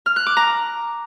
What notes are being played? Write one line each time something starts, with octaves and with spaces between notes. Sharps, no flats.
F6
F#6
D6
A#5